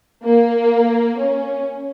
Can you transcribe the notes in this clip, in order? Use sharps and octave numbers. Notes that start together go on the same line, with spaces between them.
A#3
C#4